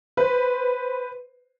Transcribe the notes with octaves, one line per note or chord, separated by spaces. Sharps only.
B4 C5